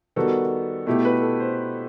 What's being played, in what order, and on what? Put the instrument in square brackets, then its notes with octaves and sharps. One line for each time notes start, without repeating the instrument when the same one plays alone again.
[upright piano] D#3 G3 B3 F#4 [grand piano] A4
[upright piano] B2 A3 E4 G4
[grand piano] B4
A4
C5